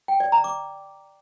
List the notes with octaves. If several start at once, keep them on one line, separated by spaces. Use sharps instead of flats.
G5
D5
A#5
D6